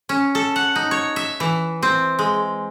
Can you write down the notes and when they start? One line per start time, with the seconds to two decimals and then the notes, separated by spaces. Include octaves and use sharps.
0.09 C#4
0.35 A4
0.56 F#5
0.76 D#4
0.91 C#5
1.16 E5
1.40 E3
1.82 C4
2.19 G#3